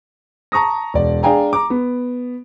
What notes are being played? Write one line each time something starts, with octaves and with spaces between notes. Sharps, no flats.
A5 A#5 C#6 D#6 A#6
E1 D5
D4 G#4 F5 G5 G#5 A#5
A#5 D6
B3